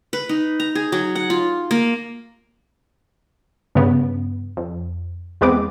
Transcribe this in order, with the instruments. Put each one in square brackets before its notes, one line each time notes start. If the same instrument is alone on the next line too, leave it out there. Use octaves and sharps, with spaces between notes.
[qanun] B4
D#4
A#5
G#4
F#3
F#5
F4
A#3
[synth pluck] G2 C#3 B3
F2
E2 G#3 B3 C4 D6